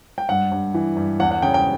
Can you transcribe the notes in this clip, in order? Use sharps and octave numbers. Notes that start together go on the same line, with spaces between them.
G5
G2 F#5
G2
E3
G2
E2 F#5
F#5
C#3 G5
G5